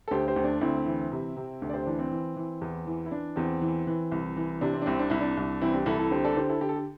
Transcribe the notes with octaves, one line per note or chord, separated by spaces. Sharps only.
A4
D2 G4 C5
G4 C5
D2
D4
D2 C4 E4
E3
C3
C3
D2
D5
G4 C5
E3 D4
C4
E3
E3
E2
E3
E4
E3 D4
E2 C4
E3
E3
C2
E3
C3 D4
C4
D4
C2 C4
D4
C2 E4
D4
C2
E3 C4 E4
D4 G4
C2 E4 A4
E4 A4
D3 G4 C5
A4 D5
D3 G4 C5
E4 A4
D3 G4
A4
G4